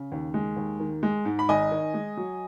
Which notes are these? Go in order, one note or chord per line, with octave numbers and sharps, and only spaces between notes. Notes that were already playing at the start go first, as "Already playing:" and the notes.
Already playing: C#3
D#2
G#3
D#2
D#3
G#3
G#2
B5
G#1 D#5 G#5
D#3
G#3
F#3